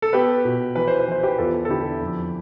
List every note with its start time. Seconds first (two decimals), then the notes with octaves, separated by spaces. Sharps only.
0.02 A4
0.13 B3 G4 B4
0.45 B2
0.76 E3 B4
0.88 C5
1.00 B4
1.08 E3 C5
1.23 G4 B4
1.38 E2 F4 A4
1.65 A4
1.69 D3 E4 G4
2.01 F2